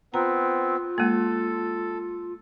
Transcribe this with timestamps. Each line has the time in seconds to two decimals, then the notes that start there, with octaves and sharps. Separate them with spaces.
0.14 B3 C4 F4 A#5
0.98 G#3 A#3 A4